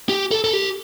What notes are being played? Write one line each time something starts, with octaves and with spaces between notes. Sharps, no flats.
G4
A4
A4
G4